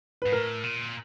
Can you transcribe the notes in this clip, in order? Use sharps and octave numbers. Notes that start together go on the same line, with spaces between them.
G#2 B4
A2 A#4
A#2